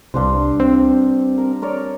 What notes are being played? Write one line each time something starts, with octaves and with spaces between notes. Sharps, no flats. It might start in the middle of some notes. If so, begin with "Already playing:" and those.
C2 G2 D4 C5
C4
A#4
A#4 C#5 D5